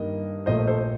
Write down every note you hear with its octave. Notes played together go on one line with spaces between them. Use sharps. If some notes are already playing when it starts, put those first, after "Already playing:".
Already playing: G2 D#3 A#3 D#5
A#1 A#2 A3 C5 D#5
A4 C5